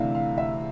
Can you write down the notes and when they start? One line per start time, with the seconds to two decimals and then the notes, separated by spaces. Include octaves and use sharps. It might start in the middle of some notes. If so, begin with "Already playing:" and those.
Already playing: D2 C3 E3 A3 D4 E5 F5
0.15 F5
0.38 E5